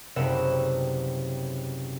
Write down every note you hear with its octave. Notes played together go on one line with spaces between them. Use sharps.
F#1 C3 G3 B3 E6 E7